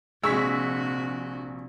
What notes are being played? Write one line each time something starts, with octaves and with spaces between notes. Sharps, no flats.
A#1 C3 G#3 F#4 C#6 E6 B6